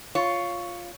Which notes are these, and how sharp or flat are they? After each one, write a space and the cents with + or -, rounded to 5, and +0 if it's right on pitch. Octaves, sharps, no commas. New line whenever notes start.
F4 +0 C#5 +5